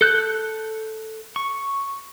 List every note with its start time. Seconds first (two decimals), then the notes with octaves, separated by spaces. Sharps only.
0.01 A4 F#6 G6
1.36 C#6